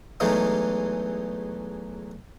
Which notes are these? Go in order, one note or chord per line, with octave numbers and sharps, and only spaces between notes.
E2 E3 F#3 G#3 A3 D#4